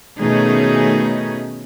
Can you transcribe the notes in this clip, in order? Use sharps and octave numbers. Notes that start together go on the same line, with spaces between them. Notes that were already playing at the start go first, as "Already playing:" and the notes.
B2 D#3 A3 C#4 D#4 G#4